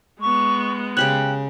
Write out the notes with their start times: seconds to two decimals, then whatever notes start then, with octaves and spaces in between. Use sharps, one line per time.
0.21 G#3 B3 C#6
0.97 C#3 G4 C#5 G5 F#6 F#7